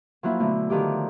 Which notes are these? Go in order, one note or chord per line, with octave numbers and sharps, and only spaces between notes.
F3 F#3 A#3 E4
B2 D3 A3
D3 D#3 F3 G4